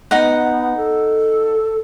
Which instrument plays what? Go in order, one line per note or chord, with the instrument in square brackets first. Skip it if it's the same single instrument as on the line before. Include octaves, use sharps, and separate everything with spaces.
[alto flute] B3 [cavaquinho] D#4 F#5
[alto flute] A4